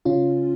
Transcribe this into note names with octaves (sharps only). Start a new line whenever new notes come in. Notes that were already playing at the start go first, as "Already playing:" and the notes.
C#3 C#4 F4